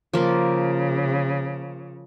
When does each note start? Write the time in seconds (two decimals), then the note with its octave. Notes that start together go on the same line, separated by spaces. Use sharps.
0.13 C#3 F3 A#3